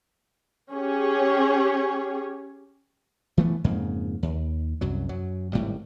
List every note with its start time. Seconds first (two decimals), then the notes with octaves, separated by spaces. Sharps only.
0.73 C#4 G4 G#4 C#5
3.38 E3 A3 B3
3.64 F2 G#2 C#3 A#3
4.23 D#2
4.81 C2 F#2 F#3
5.09 F#2 F#3
5.53 G#1 A2 G3